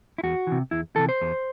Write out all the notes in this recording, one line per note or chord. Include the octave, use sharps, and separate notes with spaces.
E4
E2 F#4
C3 E3
E2 E4
C3 E3 A4
C5
E2